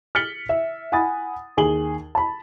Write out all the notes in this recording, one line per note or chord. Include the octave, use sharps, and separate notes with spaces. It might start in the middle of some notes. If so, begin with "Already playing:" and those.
F6 A6 B6 C#7 F#7 G7
E5
F#5 G#5 B5 D#6 A6
D#2 G#4 F#7 G7
A5 B5